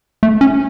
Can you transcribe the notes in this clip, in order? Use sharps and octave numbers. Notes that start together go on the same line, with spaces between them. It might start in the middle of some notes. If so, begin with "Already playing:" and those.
A3
C#4